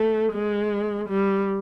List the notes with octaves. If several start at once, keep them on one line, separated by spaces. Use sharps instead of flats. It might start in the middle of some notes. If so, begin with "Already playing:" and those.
Already playing: A3
G#3
G3